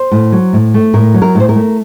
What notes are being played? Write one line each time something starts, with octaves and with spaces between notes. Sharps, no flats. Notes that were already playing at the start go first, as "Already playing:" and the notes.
Already playing: C5
A2
F#3
A2
A3
A2 A#4
F#3
A#4
A2 C5
A#4
A3